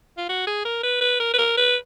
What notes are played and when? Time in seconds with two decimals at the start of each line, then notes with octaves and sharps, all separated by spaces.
0.17 F4
0.29 F#4
0.47 G#4
0.65 A#4
0.83 B4
1.01 B4
1.20 A#4
1.33 B4
1.38 A#4
1.57 B4